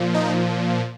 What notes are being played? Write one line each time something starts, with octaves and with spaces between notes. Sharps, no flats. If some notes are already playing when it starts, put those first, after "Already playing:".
Already playing: A#2 F3
D#4